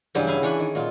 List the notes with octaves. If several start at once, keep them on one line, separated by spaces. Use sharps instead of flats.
G2 C#3 E3 F#3
E4 F5 G#5
E3 D4 C#5 E5 F#5
D#3
A#2 F#3 F4